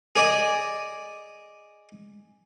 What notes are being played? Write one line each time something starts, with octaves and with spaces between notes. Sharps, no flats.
G#4 D5 D#5